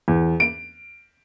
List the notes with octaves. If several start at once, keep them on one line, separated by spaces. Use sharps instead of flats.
E2
D7